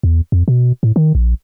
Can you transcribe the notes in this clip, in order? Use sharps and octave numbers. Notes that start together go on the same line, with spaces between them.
E2
F2
B2
A2
D#3
A#1